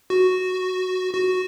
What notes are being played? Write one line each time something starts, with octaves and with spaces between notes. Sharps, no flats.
F#4
F#4